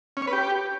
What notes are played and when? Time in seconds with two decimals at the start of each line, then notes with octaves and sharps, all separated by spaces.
0.17 C#4
0.22 C#5
0.27 B4
0.33 G4